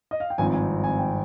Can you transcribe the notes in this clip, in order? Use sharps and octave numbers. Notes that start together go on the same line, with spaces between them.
D#5
F5
G5
G#1 G2 F3 C4 D#4 G#5
G#5
G#5
G5